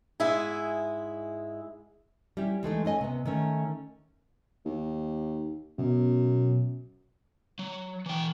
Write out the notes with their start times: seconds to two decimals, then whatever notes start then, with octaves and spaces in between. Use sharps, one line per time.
0.20 G#2 G#3 E4 E5 G#5
2.37 G3 C#4 E4 G4
2.63 E3 G#3 A3 D#4
2.85 A3 C#4 D#5 G#5
3.01 C3 B3
3.26 D#3 A3 C#4
4.65 D#2
5.78 F#2 B2
7.59 F#3
8.06 E3 G5